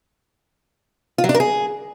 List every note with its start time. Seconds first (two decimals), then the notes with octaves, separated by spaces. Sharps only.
1.18 F4
1.24 F#3
1.29 D4
1.34 A#4
1.40 G#4